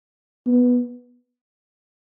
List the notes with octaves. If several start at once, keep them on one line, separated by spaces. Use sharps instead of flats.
B3